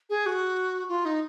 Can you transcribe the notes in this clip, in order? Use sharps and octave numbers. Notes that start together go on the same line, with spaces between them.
G#4
F#4
F4
D#4